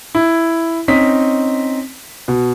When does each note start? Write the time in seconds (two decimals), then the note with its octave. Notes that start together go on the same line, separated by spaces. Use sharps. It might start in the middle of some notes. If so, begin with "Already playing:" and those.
0.15 E4
0.88 C4 C#4 D#4 D#5 B6
2.28 B2